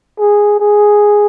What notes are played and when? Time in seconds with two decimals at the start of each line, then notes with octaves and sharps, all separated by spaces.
0.19 G#4
0.60 G#4